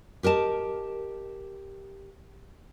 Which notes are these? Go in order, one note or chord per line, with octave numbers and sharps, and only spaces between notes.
G4 A#4 D#5 A5